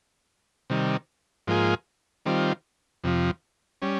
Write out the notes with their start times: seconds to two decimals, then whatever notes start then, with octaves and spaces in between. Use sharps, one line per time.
0.70 C3 D#3 G3
1.47 G#2 F3 A#3 F4 G#4
2.26 D#3 G3 C4 F4
3.04 F2 C3 F3
3.82 G3 C#4